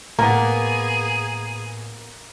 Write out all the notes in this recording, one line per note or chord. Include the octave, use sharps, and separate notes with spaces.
A2 A#3 B3 G#4 A#5